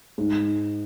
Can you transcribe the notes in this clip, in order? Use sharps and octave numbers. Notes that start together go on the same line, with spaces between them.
G#2